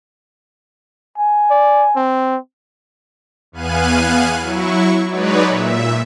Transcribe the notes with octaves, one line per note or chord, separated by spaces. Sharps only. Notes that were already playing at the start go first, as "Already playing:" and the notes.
G#5
D5
C4
E2 B3 F5 G#5 F#6 D#7
F#3 E4 C#6
F#3 G#3 D#4 B4 C#5 D5
A#2 E5